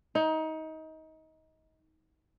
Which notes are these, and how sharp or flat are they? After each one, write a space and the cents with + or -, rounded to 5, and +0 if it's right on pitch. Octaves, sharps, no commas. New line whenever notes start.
D#4 +25